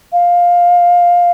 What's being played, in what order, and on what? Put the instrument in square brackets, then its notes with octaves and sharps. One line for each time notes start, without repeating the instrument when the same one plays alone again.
[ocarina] F5